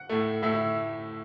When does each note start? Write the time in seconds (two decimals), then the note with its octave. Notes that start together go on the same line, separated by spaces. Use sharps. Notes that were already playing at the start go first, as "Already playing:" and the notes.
Already playing: F#5
0.09 A2 A3
0.42 A2 A3 E5 E6
0.54 E4